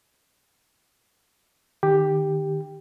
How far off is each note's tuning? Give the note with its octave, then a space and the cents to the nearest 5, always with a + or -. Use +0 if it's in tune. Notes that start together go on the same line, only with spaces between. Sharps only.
D#3 -35 G4 +5